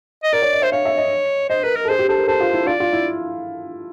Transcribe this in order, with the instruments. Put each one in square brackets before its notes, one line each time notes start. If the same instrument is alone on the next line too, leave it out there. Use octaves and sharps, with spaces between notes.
[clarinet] D#5
[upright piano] A#4 [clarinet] D5
[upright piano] C#5
D#5
[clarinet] C5 [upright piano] E5
[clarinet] C#5 [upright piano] F5
[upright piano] E5
D#5
[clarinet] C5 [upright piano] D#5
[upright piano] A#4 [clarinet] B4
[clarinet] A#4
[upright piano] A4
[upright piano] G#4 [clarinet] C5
[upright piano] G4
[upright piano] A4 [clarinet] C5
[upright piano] A#4
[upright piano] A4 [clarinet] C5
[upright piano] F4
E4
[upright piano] F4 [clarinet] D5
[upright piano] F4
E4